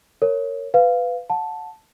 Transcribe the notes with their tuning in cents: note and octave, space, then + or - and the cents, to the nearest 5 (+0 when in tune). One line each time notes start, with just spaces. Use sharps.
A#4 -15 C#5 +0
B4 +20 F5 +0
F#5 -30 A5 +0